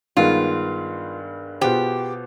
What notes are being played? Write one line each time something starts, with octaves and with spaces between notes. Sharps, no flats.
G2 D#3 G#3 B3 F4
B2 B3 F4 G4 G#4 C5